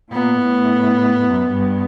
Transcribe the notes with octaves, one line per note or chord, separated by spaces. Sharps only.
A#2 B3
A2
F#2
G2